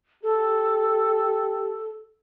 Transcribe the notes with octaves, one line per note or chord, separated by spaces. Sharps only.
G4 A4